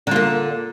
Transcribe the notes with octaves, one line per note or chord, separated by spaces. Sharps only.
D3 A#3 F4